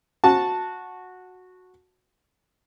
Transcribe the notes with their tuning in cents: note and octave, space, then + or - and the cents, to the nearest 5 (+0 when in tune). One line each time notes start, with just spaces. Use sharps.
F#4 -10 A5 +0